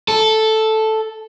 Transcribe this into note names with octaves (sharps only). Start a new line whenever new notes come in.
A4